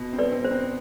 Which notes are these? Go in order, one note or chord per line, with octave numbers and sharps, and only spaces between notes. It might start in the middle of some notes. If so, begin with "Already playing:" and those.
Already playing: B2
C4
B4 D5
C4
C5
C4